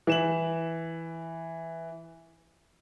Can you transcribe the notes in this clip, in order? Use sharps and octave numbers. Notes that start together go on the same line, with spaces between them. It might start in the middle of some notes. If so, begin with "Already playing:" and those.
E3 E7 F#7